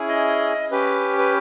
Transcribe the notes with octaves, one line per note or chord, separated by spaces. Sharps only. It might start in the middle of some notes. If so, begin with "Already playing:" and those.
Already playing: C#4 E4 G#4
D#5
C#4 G4 B4
B4